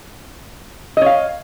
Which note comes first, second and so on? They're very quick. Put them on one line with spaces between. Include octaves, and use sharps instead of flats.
D#5 C#5 F5